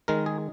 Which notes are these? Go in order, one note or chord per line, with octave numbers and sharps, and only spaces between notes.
D#3 G#3 A#4
G#4